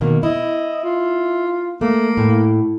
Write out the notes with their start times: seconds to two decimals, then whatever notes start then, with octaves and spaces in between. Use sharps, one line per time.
0.01 B2 D#3 A#3
0.23 E4 D#5
0.83 F4
1.81 A3 A#3
2.17 A2